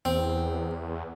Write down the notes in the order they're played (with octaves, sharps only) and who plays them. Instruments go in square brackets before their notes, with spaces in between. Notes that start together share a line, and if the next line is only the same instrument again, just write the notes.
[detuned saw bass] E2 [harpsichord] C4